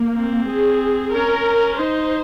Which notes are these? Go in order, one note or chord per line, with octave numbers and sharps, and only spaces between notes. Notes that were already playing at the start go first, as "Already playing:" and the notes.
Already playing: A#3
C4
G#4
C#4 A#4
D#4 C5